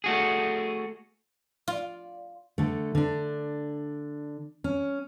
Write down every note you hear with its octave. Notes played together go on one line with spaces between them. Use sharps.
A3 F#4 G#4
F4 D5
D3 A3
D3 D4
C#4